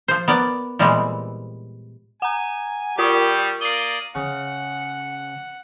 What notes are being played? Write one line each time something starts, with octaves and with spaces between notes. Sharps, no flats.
F3 C5
B3 A#4 D5
A#2 E3 G3 G#3 B3 C4
F#5 G#5 A#5
G3 F4 G4 A#4 C#6 D#6
A#3 D5 D#6 C7 G7
C#3 F#5